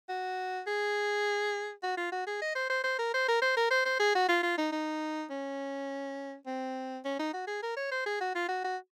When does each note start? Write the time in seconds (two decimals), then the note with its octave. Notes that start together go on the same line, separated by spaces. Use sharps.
0.09 F#4
0.67 G#4
1.83 F#4
1.97 F4
2.12 F#4
2.27 G#4
2.42 D#5
2.55 C5
2.70 C5
2.84 C5
2.99 A#4
3.14 C5
3.29 A#4
3.42 C5
3.57 A#4
3.71 C5
3.86 C5
4.00 G#4
4.15 F#4
4.29 F4
4.43 F4
4.58 D#4
4.72 D#4
5.31 C#4
6.47 C4
7.05 C#4
7.20 D#4
7.33 F#4
7.47 G#4
7.63 A#4
7.77 C#5
7.92 C5
8.06 G#4
8.21 F#4
8.35 F4
8.49 F#4
8.64 F#4